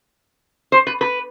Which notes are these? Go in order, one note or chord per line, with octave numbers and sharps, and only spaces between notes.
C5
B4
B4